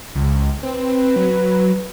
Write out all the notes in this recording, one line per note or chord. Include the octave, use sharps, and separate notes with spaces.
C#2
C4 B4
F#3